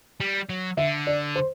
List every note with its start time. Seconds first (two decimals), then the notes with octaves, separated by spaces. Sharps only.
0.21 G3
0.49 F#3
0.77 D3 E5
1.07 D5
1.35 C5